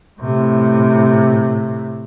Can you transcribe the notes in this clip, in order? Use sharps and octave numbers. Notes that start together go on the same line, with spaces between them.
A2 C3